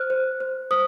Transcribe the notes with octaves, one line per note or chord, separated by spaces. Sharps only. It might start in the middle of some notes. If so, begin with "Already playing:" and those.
Already playing: C5 F6 F#6
C5
C5
C5 D#6